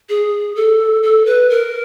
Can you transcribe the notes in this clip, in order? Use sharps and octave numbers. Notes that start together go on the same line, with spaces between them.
G#4
A4
A4
B4
A#4